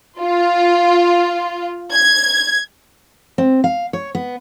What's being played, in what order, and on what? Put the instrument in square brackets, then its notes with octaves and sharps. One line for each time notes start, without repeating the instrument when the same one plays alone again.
[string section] F4
G#6
[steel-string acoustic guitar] C4
F5
C#5
B3